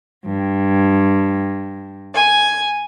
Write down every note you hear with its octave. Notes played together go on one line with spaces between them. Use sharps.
G2
G#5